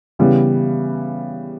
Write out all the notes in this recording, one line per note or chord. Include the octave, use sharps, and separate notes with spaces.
C#3 E3 G3 B3